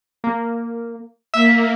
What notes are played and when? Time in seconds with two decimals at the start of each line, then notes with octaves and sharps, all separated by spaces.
0.24 A#3
1.34 A#3 E5